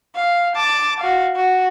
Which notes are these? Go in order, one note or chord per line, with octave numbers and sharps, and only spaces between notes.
F5
A5 D6
F#4 F5
F#4